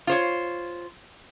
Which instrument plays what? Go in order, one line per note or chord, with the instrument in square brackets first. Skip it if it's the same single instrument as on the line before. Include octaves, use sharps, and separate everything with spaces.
[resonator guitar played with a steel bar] F4 C5 C#5